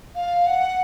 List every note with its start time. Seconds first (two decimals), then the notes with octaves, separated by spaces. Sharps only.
0.15 F5
0.46 F#5